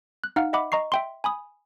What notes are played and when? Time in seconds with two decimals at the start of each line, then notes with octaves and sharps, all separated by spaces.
0.24 F#6
0.36 D#4 F5 F#5 F6
0.53 D#5 E5 F#5 B5 D6
0.72 D#5 A#5 C#6 C7
0.92 E5 G5 C6
1.24 G#5 B5 D#6